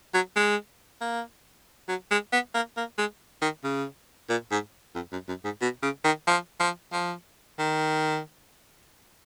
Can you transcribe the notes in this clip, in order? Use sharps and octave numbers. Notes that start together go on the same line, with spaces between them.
F#3
G#3
A#3
F#3
G#3
B3
A#3
A#3
G#3
D#3
C#3
A#2
G#2
F2
F#2
F#2
G#2
B2
C#3
D#3
F3
F3
F3
D#3